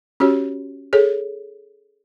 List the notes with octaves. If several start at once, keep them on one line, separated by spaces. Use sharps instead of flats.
C#4 F#4 G4 C#5
G#4 A4 C#5